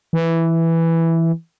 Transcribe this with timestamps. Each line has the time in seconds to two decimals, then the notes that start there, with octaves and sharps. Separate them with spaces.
0.13 E3